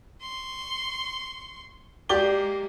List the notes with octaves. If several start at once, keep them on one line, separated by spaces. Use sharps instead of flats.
C6 C#6
G#3 A#3 G4 D5 G7